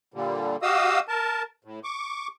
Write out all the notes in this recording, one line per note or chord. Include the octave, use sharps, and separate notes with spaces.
A#2 D3 G3
F#4 G4 D#5 F5 D#6 E6
A#4 A5
A2
C#6 D6